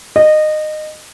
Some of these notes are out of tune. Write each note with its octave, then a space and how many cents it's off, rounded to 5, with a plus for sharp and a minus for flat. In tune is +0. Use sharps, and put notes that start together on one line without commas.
D#5 -20